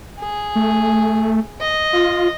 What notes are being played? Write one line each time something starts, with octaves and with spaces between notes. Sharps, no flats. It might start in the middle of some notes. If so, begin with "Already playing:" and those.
G#4
A3
D#5
F4